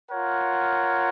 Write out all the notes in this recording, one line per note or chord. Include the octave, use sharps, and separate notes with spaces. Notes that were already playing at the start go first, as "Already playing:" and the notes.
F4 A#4 C#5 F#5